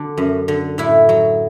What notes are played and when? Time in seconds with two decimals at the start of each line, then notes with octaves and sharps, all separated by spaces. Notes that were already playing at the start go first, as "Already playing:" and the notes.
Already playing: D3 F#3 D4
0.17 F#2
0.48 D3
0.78 A2 E4
1.09 F#3